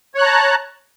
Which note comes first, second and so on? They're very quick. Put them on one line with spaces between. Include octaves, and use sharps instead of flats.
C#5 F#6 A#5 A5